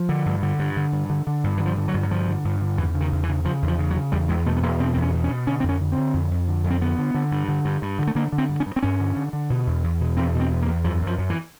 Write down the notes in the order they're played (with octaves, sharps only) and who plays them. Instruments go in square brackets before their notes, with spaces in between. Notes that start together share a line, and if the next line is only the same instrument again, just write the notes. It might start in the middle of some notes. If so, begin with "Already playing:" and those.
Already playing: [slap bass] F3
D3
G2
D3
G2
D3
G2
D3
D3
G2
E3
D3
F3
D3
F#3
G2
F#3
D3 F3
D3
G2
D3
E2 E3
C#3
D#3
E2
E3
C#3
C#3 F3
E2
F3
C#3
F#3
C#3
E2 G3
E2 G#3
B2 A3
B3
E2 A#3
B2 C4
E2 C4
C#4
B2
C#4
B2
D3 C#4
C4
F2
C#4
D3
C4
D3
F2
F2
D3
F2
C4
D3 B3
D3
D3
G2
D3
G2
G2
D3
A3
D3 A#3
D3
C4
G2
C#4
G2
C4
G2 C#4
D3
D3
D3
B2
E2
E2
B2
E2 C4
B2
C4
E2
A#3
E2
F#2 F3
F#2
F3
F#2
E3